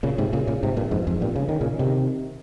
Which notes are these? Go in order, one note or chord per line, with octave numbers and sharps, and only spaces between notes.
A#2 C#3
G#2 C3
A#2 C#3
A#2 C#3
G#2 C3
G2 A#2
F2 G#2
F2 G#2
G2 A#2
C#3
D#3
A#2 C#3
C3 D#3